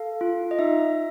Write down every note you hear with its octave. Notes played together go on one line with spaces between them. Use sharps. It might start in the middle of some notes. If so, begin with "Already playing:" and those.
Already playing: A4 F5
F4
D#5
D#4 E5